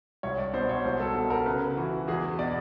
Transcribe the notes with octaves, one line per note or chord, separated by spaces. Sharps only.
C2 C#5
D5
B2 C5
C#5
C2 C5
A4
B2 A4
A#4
C#3 B4
E3 F#4
E2 G#4
B2 D5